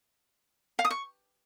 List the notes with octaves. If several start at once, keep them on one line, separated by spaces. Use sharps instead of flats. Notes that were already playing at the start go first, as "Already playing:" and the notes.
F5
D#6
C#6